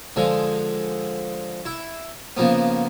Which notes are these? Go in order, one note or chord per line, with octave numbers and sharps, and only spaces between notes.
D3 F3 G#3
E4
C#3 F3 A#3 B3